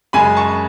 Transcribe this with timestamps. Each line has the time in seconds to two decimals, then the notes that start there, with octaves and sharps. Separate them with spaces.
0.13 F#2 C#3 G#3 G#5 B5
0.37 A5 C#6